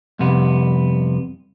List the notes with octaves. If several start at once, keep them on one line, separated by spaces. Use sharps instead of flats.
C2 F2 C3 B3